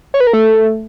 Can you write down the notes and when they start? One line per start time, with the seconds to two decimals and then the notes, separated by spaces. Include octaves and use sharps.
0.14 C#5
0.20 B4
0.27 A#4
0.33 A3